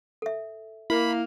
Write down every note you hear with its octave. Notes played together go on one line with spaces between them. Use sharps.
A4 E5
A#3 E4 B5